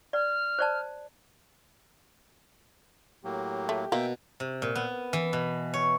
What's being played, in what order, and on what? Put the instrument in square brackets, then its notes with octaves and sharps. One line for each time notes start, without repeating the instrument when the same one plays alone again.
[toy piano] D5 [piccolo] F6
[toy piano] C5 D5 A5
[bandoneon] A2 F#3 A#3 [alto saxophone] G4
[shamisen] A3
[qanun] B2 [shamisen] A#3 [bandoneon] E5 G5
[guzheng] C3
A#2
B3
E3
B2
C#5